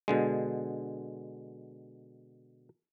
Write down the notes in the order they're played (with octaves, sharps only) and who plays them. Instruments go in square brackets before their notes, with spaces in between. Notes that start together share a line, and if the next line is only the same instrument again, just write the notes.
[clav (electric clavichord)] B2 D3 G#3